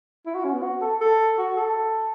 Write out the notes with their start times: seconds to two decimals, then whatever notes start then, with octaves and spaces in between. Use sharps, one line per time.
0.26 E4
0.35 F#4
0.45 C#4
0.54 B3
0.63 F#4
0.82 A4
1.01 A4
1.38 F#4
1.57 A4